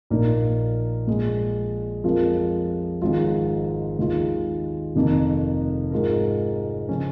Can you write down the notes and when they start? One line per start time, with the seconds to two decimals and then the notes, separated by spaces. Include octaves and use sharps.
0.10 A#1 A#2 A#3 D#4 A#4
1.07 A#1 A#2 G#3
2.04 F2 F3 G#3 F4 A#4
3.02 G#1 G#2 G#3 F4
3.99 D#2 D#3 G#3 F4 G#4
4.96 F1 F2 D#3 A#3
5.91 G#2 G#3 F4 A#4
6.89 C#3 F3 C#4